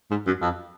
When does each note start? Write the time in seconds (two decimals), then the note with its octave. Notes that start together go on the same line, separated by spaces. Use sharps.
0.11 G#2
0.27 F#2
0.42 F2